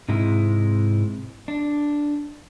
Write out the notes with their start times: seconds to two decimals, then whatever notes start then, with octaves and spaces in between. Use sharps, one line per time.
0.08 G#2 C3 G#3 E4
1.48 D4